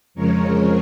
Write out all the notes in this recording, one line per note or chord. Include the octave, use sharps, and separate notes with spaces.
F2 C#3 F3 G#3 A#4 C#5